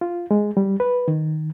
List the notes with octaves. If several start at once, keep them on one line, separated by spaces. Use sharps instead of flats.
F4
G#3
G3
B4
D#3